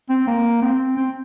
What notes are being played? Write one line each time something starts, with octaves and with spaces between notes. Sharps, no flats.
C4
A#3
C4
C4